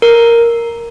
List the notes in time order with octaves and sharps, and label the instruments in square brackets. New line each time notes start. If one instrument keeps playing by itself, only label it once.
[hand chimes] A#4